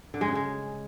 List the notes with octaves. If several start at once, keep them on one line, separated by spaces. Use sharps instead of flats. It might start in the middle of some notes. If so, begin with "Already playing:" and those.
D3
G#3
C#3
G#3